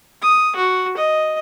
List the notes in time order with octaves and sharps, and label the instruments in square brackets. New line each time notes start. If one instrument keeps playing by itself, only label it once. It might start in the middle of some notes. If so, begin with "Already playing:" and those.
[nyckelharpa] D#6
F#4
D#5